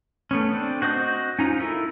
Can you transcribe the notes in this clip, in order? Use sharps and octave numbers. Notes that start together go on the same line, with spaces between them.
A3 B3 C#4
C4 D4
F#4 C5 D#5 D6 G6
C#4 D#4 F4
E4 A4 A#4